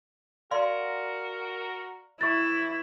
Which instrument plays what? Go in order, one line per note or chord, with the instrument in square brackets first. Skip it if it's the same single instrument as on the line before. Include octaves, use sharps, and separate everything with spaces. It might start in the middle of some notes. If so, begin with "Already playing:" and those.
[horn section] F#4 A#4 [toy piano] D5 F5 C6
[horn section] E3 [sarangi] E4 [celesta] C#6 A6